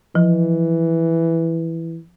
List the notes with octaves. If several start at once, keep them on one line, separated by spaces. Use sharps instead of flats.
E3 F3